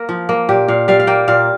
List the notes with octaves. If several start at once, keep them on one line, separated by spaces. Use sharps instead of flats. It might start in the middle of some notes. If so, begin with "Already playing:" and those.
Already playing: A#3 A#4
F3
A#3
A#2 G4
A#2 F5
G3 F5
F5
A#3 G5
A#2 F5